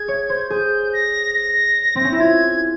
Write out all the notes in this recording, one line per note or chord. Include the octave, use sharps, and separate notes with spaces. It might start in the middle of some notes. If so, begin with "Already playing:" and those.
Already playing: G#4 G#6
C#5
C5
G#4 G6
A#6
A#6
C4
C#4
E4 A#6
F4 G#6